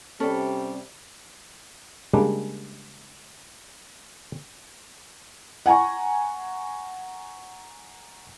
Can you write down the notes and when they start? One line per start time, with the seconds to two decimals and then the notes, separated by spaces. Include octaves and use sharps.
0.20 C3 G3 C#4 A4
2.13 C#3 G3 G#3 A#3 D4
5.66 F#5 G#5 A#5 C#6